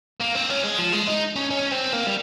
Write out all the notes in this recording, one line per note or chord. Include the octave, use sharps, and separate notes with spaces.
A#3
C4
C#4
G#3
F3
G#3
D#4
C#4
C#4
C4
A#3
G3